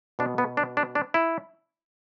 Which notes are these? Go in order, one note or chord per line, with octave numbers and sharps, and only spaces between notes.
B2 B3 D4
B3
D4
D4
D4
E4